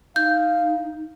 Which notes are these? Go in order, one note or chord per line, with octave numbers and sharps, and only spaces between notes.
D#4 F5 G6